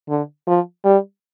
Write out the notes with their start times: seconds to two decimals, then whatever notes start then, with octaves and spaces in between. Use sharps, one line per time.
0.09 D3
0.47 F3
0.85 G3